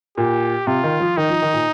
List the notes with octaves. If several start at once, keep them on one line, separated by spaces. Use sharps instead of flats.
A#2 G4
C3 F4
D#3
F3
D#3 D#4
F3
D#3
A#2